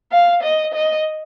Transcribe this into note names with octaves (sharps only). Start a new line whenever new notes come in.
F5
D#5
D#5